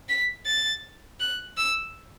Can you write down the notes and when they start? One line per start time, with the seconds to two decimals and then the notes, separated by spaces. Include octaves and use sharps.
0.09 B6
0.46 A6
1.20 F#6
1.57 E6